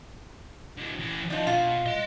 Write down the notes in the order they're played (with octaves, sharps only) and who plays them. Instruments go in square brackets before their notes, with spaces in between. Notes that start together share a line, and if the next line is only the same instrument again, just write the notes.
[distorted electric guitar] D3 F#3
E3 C#4
[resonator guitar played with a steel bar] F3 D#4 [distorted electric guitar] D4 D#5
[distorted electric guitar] B2 [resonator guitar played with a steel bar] F4
[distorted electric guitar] D#5 C6